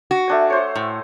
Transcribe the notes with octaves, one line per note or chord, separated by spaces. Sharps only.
F#4
A3 D4 G#5
C5 C#5
A2